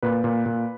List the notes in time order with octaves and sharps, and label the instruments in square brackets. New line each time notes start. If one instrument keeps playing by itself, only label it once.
[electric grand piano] A#2 B4
A#2
A#2